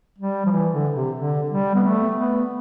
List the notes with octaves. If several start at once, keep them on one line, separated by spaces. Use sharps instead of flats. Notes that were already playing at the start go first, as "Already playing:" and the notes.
G3
F3
E3
D3
C3
D3
G3
B3
A3
B3